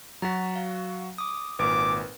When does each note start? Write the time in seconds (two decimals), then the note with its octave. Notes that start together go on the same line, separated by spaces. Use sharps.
0.22 F#3 F#4 A#5 A6 B6
0.56 F5
1.18 D6 D#6
1.59 G#1 A#2 A#4 B4 D6